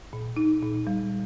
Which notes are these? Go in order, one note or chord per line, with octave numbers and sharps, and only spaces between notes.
A#2
D#4
A#2
G3